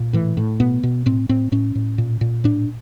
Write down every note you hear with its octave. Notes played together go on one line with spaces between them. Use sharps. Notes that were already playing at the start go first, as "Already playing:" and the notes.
Already playing: A#2
A2 E3
A2
B2 B3
B2
A2 C4
A2 C4
A2 C#4
A2
A#2
A#2
A2 D4